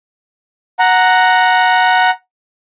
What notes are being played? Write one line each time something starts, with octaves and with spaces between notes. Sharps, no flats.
F#5 A#5